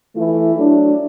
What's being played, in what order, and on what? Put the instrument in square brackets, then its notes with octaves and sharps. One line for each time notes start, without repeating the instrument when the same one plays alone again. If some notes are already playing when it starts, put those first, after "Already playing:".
[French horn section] E3 A3 E4
F#3 A3 D4